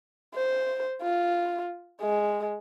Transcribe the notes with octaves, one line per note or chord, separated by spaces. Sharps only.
C5
F4
G#3